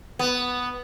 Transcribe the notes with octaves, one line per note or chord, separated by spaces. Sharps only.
B3